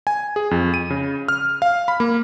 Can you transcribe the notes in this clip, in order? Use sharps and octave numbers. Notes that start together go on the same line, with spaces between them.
G#5
G#4
F2
D#7
C#3
F6
F5
B5
A#3